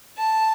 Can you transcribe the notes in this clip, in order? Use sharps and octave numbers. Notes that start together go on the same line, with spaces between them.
A5